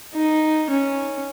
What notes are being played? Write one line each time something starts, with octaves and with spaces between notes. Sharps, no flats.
D#4
C#4